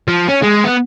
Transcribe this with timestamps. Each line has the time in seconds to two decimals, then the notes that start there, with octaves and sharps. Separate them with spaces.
0.08 F3
0.29 C#4
0.43 G#3
0.65 B3